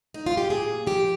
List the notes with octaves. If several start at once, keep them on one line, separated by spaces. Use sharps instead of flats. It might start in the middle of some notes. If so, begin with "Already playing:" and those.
D#4
F4
G4
A#2 G#4
F3 G4